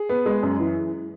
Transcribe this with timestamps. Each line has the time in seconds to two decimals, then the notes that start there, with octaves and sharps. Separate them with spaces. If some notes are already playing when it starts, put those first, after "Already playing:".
Already playing: G#4
0.09 B3
0.26 G#3
0.43 F#2
0.60 E3